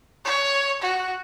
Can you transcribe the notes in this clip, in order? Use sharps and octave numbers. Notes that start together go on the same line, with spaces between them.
C#5
F#4